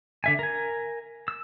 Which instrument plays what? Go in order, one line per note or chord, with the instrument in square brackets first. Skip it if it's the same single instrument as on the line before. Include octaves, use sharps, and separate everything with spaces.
[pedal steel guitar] D3 E5 G#5
A#4 G#5
E6